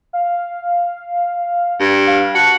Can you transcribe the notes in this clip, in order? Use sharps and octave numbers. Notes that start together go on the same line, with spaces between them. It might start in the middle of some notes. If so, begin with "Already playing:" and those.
F5
G2
F5
F#4 A5